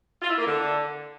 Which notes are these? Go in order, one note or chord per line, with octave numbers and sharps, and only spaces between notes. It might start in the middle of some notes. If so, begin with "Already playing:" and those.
F4
E4
A#3
D3